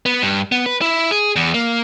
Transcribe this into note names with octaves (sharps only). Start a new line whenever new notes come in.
B3
G2
B3
B4
E4
G#4
E2
A#3